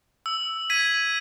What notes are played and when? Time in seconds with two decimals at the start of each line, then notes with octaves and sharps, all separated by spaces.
0.26 E6
0.70 G#6 B6 D#7